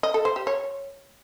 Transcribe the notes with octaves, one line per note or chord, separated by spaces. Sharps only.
D#5
A4
C5
G4
C#5